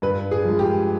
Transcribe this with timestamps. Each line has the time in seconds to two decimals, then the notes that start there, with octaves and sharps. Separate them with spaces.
0.02 G2 B4
0.31 G#4
0.45 F3 G#3
0.59 G4